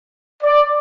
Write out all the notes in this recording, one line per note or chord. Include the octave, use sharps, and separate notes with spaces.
D5